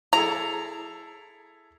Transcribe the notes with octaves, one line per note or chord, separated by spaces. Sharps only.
E4 G#4 A4 A#5